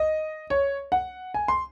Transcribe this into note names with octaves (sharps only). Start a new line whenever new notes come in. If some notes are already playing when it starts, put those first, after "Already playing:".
Already playing: D#5
C#5
F#5
G#5
C6